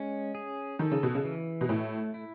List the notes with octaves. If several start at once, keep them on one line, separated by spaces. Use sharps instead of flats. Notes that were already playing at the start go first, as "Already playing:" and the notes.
Already playing: G#3 C#4
G#4
D#3 A4
C#3
B2
C#3
E3
B2
A2 A3
E4